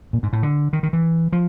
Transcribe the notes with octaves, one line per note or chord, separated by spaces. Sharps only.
A#2
G#2
A2
D3
D#3
D#3
E3
F3